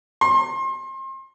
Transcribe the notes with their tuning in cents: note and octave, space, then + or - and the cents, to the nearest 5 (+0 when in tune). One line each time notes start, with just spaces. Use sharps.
C6 +35